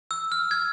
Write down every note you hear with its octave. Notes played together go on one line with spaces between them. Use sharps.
E6
F6
G#6